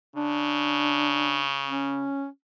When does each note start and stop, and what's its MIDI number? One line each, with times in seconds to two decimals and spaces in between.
0.16 2.09 49
0.16 1.44 62
1.68 2.27 61